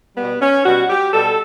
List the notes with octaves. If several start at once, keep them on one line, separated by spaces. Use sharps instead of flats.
B2 G3 B3
C#4
B2 G3 F#4
G4
B2 G3 A4